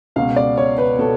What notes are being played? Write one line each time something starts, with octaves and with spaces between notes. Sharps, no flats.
C#2 B2 F5
D5
C#5
B4
B2 A4